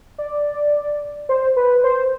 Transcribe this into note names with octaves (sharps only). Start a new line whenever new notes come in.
D5
C5
B4
C5